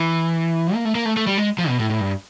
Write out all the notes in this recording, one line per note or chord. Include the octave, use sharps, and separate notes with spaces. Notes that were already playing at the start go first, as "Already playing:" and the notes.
Already playing: E3
A#3
A3
A#3
A3
A3
G3
G#3
F3
B2
A2
A2
G2